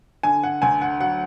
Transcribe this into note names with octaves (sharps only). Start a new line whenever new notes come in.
D3 G#5
F#5
D2 G#5
F#5
F#3 F#5